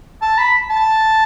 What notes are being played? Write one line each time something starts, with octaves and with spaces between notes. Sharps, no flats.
A5
B5
A5